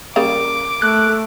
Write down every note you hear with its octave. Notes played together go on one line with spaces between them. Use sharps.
C#3 G3 A#3 D6
A3 F#6